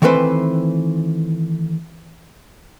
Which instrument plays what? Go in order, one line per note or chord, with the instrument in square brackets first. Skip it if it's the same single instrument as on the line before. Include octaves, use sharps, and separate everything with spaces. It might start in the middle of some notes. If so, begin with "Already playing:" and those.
[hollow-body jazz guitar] D#3 E3 A3 C4 B4 C5